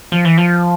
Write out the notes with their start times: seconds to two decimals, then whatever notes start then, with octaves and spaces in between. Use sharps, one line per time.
0.12 F3
0.25 E3
0.38 F3